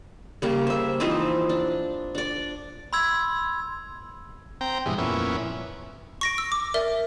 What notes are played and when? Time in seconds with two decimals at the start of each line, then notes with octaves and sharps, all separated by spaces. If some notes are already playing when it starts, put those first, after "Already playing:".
0.42 C#3 G3 A#3
0.67 C5 E5
1.00 E3 F3 C4 D#4
1.49 D4
2.15 D4 D5
2.93 B5 C6 E6 G#6
4.61 C4 G5 A#5
4.86 G2 B2 E3 G#3
4.98 F2 A#2 B3 C#4 E4
6.21 C#6 A#6 D7
6.38 E6
6.52 D6
6.74 A#4 D5 E5